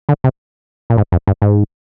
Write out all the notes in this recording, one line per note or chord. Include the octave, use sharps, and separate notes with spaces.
D3
C3
A#2
G#2
F2
G2
G#2